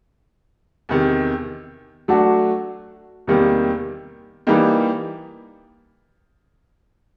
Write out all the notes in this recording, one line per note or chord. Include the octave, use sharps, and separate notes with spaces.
E2 C3 D#3
F#3 A3 D4 F#4
E2 C3 D#3 G3 A#3
E3 G3 A#3 D#4 G4